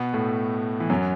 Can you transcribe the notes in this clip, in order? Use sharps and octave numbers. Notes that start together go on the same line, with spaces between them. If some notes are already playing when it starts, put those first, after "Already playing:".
Already playing: B2 B3
A2 A3
E3
F#2 F#3